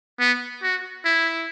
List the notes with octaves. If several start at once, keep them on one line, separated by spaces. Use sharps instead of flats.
B3
F#4
E4